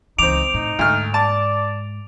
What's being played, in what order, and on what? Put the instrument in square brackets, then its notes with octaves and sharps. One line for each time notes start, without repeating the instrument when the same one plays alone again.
[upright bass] C#2 E3 [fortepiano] C4 D6 [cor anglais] D#4 [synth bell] D7 F7
[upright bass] A2 [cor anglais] D#4
[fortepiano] D2 F6 [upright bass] G#2
[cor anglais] D5 [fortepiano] A5